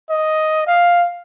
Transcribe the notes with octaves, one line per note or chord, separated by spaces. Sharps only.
D#5
F5